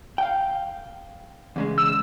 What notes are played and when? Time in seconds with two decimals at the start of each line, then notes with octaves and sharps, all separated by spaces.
0.18 F5 G5
1.56 E2 C#3 G#3
1.78 E6